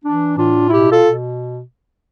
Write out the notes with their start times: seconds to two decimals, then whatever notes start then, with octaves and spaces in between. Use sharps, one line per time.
0.05 E3 D4
0.37 A2 D4 F4
0.69 B2 E4 G4
0.91 F4 A4
1.02 B2